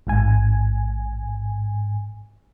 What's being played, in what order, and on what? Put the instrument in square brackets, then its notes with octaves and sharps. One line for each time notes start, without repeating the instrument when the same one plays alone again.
[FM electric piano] A1 G#2 G#5